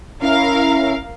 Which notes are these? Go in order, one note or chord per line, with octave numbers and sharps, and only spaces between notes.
C#4 E4 A#4 E5 F5